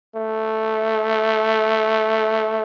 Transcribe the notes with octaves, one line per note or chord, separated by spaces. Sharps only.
A3